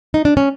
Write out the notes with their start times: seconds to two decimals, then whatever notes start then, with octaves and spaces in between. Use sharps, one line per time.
0.14 D#4
0.25 D4
0.37 C#4